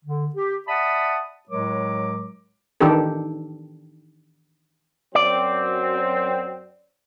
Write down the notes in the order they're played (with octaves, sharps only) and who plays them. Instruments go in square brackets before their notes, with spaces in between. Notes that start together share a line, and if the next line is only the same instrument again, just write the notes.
[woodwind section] D3
G4
D5 E5 F#5 A5 B5 D#6
A2 F#3 G#3 A#4 C#5 D6
[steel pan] D#3 E3 D4 G4 A4
[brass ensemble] F#2 F#3 C4 [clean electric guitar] D5